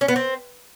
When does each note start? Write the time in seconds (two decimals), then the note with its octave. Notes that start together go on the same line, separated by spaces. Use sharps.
0.01 C#4
0.08 B3
0.16 C4